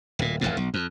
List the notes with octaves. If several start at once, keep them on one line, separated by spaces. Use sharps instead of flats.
D1 A#2
D#1 G#1 F2 A2
B1
F2